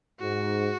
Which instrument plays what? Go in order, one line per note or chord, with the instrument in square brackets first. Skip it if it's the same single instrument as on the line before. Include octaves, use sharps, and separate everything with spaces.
[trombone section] G#2 [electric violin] F#4